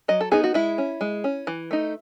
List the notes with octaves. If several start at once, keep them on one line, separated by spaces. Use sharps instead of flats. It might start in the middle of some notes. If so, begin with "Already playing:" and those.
F#3 D#5
A4
B3 D#4 G#4
F#4
G#3 E4
C#4
G#3
C#4
E3
A3 D#4